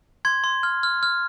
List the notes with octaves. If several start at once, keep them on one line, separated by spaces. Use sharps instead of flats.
C6 G#6
C6
F6
F6
F6